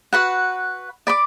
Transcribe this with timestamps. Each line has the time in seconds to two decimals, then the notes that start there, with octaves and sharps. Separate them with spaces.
0.13 F#4 B4 F#5
1.07 D5 B5 D6